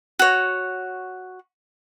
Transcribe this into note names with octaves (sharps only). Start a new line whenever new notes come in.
F#4 C#5